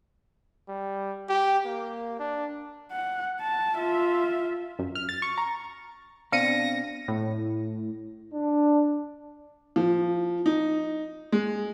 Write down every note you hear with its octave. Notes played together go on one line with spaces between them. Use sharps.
G3
G4
A#3
D4
F#5
A5
F4 E5
F#2
F6
A6
C#6
A#5
B2 C4 D4 F5 A#6 C#7 D#7
A2
D4
F3
D#4
G#3